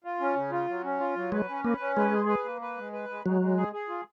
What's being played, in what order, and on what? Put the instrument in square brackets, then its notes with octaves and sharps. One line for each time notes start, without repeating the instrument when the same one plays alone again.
[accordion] F4
C#4
C#3
F4
F#3
C#4
F4
F#3
[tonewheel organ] G#3 [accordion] B4
[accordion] C#4
[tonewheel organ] A#3 [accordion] B4
[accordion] C#4
[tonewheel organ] G#3 [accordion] B4
[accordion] G#4
B4
A#3
B4
G#3
B4
G#3
[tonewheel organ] F#3 [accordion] G#3
[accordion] G#3
G#4
G#4
F4